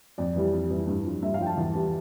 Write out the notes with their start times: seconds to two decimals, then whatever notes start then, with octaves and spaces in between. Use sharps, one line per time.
0.18 F2 D5
0.36 E3 G3
0.53 F2
0.71 E3 G3
0.87 G2
1.05 F3
1.23 G2 E5
1.34 F5
1.40 F3 G5
1.46 A5
1.57 E2
1.75 E3 G3